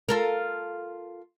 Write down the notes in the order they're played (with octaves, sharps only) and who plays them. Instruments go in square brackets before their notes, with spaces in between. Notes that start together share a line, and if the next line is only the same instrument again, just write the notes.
[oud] F4 A4 A#4